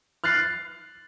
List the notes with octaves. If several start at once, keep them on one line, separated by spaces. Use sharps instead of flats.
F6 F#6 A6 C7